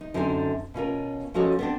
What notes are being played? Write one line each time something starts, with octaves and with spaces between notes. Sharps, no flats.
D#4
F#2 D3 C4 D#4 C5 G#5
B2 C#4 F4 A#4
F3 C#4 F#4 A4 C#5 D#5
B3 C4 D4